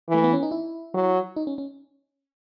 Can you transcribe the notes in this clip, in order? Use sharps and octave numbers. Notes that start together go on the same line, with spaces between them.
E3
A3
B3
C#4
D#4
E4
F#3
D#4
C#4
C#4